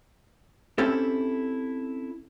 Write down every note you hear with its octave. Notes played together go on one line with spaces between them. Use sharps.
C4 C#4 E4 G4 A4